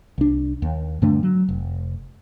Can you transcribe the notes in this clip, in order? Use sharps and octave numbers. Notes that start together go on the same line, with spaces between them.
C2 D4
D#2
G2 D3 A3 D4
F#3
F1